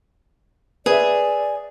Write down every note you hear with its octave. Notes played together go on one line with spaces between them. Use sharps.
G#4 B4 D5 E5